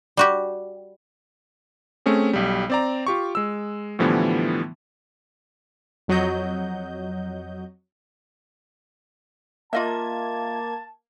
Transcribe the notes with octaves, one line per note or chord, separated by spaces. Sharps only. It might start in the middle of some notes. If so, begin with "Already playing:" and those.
G3 F#4 G4
A3 C4 C#4 G#4
B1 G3
C4 D5 A#5
F4 G4 C#6
G#3 E6
A2 D3 E3 F3 G3 B3
F2 F#3 F#4 D#5 G6
A#3 F4 D#5 E5 A5 G#6